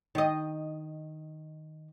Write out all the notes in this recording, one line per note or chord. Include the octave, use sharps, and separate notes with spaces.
D#3 D#5